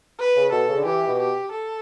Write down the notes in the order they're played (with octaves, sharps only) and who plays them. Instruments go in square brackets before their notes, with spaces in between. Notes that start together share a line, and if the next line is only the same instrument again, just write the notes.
[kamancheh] B4
[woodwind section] C#3
[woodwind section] B2 [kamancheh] A4
[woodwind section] C#3
D3
[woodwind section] E3 [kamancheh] G4
[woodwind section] B2
[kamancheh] G4
A4